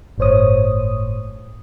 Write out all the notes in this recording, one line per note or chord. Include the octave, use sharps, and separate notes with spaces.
G1 A2 C5 C#5 D#6